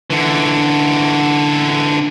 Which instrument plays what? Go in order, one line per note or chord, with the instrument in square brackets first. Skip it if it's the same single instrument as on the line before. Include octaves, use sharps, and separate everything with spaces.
[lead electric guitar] D3 E3